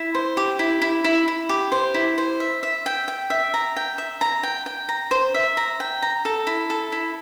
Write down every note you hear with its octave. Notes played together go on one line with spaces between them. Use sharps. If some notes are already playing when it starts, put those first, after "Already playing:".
Already playing: E4
C5
G4
E4
E4
E4
E4
G4
C5
E4
C5
E5
E5
G5
G5
E5
A#5
G5
E5
A#5
G5
G5
A#5
C5
E5
A#5
G5
A#5
A4
E4
A4
E4